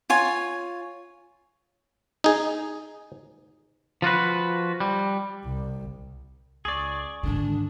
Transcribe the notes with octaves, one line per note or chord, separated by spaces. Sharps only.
F4 C#5 G#5
D#4 G#4
F3 F4 F#4 B4
G3
C2
C#2 G#4 D5 C#6
G#2 D3 D#3 D4